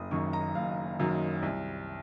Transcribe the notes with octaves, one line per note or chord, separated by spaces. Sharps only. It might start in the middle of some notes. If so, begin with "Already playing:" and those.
Already playing: F#1 D#6
F#2 D#3 F#3 C#6
A#5
F#1 F5
F#2 D#3 F#3
C2